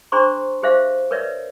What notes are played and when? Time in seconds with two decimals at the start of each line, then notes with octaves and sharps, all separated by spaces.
0.12 D4 G#4 C5 A#5 C6 C#6
0.63 G4 G#4 C5 E5 F5
1.11 A#4 B4 C#5 D5 E5